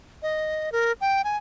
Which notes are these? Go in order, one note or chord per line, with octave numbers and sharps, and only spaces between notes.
D#5
A#4
G5
G#5